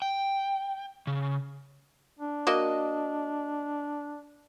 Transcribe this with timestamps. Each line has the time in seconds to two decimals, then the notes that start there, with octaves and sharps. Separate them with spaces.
0.02 G5
1.07 C#3
2.19 D4
2.47 A#3 F#4 D#5